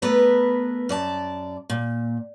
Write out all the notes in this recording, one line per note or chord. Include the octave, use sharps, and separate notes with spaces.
A3 B3 A#4 B4
F#2 D5 A5
A#2